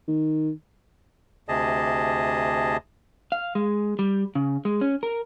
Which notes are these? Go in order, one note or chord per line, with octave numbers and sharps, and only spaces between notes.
D#3
D2 C3 G#4 D#5 A5
F5
G#3
G3
C#3
G#3
C#4
A#4